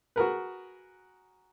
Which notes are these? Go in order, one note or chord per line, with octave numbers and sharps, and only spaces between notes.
F#4 G#4 A#4 B4